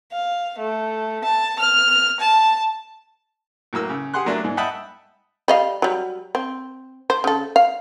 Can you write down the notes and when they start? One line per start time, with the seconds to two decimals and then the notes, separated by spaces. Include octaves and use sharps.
0.12 F5
0.58 A3
1.25 A5
1.59 F6
2.20 A5
3.73 A2 F#3 A#3 E6
3.89 C#3
4.14 G4 G#4 F#5 C6 F#6
4.26 F#3 A3 A#3 D4
4.44 G#2
4.57 D#5 E5 F#5 G5 A5 B5
5.48 G3 D#5 F5
5.82 F#3 G3
6.35 C4
7.10 C5
7.24 C#3 A4
7.56 F5